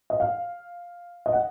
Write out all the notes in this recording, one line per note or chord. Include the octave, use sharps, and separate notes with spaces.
D#5
F5
D#5
F#5